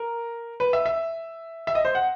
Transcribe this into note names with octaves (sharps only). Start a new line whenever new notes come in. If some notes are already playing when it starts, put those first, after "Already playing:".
Already playing: A#4
B4
E5
E5
E5
D#5
C5
F#5